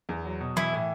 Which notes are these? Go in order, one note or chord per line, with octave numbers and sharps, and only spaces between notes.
E2
F#3
B2
E3 E4
A2